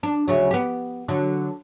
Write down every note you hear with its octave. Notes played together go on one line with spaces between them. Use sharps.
D4
D2 C#3 F#3
B3 G4
D3 F#3